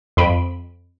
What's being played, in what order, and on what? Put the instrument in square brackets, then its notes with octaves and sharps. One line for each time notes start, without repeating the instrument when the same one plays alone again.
[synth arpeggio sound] F2 B5 D7